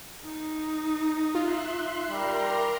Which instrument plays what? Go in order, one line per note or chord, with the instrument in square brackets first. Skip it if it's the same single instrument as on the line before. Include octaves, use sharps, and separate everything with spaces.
[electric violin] D#4
[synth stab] F4 [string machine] E5 C6 F#6
[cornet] G3 [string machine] A#4 A#5 C6